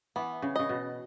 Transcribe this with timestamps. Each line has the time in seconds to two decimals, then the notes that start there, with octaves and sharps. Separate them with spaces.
0.16 E3 B3
0.42 C#3
0.56 C#3 D#5
0.69 B2